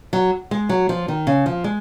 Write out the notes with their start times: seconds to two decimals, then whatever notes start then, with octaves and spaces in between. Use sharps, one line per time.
0.13 F#3
0.51 G#3
0.69 F#3
0.89 F3
1.08 D#3
1.27 C#3
1.46 F3
1.64 G#3